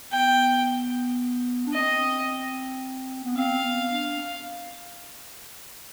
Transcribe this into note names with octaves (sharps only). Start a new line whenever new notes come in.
B3 G5
D4
C4 D#5
B3
C4 F5
B3
D4